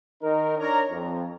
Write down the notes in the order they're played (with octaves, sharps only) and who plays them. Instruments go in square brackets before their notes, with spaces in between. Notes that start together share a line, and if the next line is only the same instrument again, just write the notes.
[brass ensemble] D#3 D#4 A#4
D4 A#4 C#5 A#5
F2